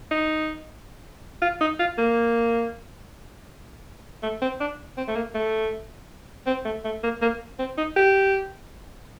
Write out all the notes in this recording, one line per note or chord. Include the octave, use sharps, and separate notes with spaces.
D#4
F4
D#4
F4
A#3
A3
C4
D4
C4
A3
A#3
A3
C4
A3
A3
A#3
A#3
C4
D#4
G4